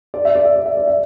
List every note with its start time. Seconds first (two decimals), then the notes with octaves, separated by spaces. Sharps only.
0.14 D5
0.25 E5
0.36 D5
0.45 E5
0.56 D5
0.66 E5
0.77 D5
0.87 E5